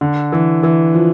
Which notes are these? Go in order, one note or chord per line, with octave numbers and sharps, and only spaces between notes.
D3
E3
E3
F3